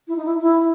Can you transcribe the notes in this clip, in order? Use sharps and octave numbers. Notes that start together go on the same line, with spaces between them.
E4
D#4
E4
E4